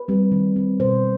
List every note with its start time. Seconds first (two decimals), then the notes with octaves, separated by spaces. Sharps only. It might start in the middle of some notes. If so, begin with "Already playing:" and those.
Already playing: B4
0.08 G3 C4
0.32 D#3
0.56 G3 C4
0.80 B2 C5